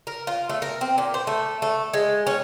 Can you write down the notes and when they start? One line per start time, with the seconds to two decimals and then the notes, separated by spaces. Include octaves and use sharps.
0.07 A#4
0.27 F4
0.50 A3
0.62 A#4
0.81 C4
0.98 A#2
1.14 C5
1.27 A3
1.62 A3
1.94 G#3
2.27 C#4